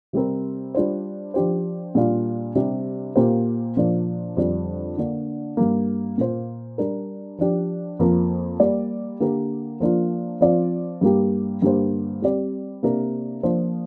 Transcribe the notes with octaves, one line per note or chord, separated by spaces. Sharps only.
C3 G3 C4 A#4
G3 D4 F4 C5
F3 D4 G4 C5
A#2 G3 D4 F4
C3 G3 D4 G4
A#2 A#3 G4 C5
A#2 F3 A#3 D4
F2 D3 G3 D4
D3 A#3 D4
G2 G3 A#3
A#2 A#3 F4 C5
G3 D4 A#4
F3 D4 G4
F2 F3 A#3 F4 A#4
G3 A#3 G4 D5
D3 A#3 G4 A#4
F3 A#3 D4 F4
F3 C4 F4 D5
G2 G3 A#3 G4
G2 D3 A#3 G4 C5
G3 C4 G4 D5
C3 A#3 D4 A#4
F3 A#3 D4 F4 C5